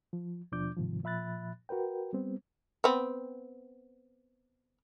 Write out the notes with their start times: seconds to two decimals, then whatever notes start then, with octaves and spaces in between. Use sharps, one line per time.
0.13 F3
0.52 D#2 B2 F3 D4 D6 G6
0.77 G#2 C3 D#3 F3
1.03 A#2 F3 E5 B5 F#6 A6
1.69 F#4 A#4 B4 G5
2.13 G3 B3 C4
2.84 B3 C4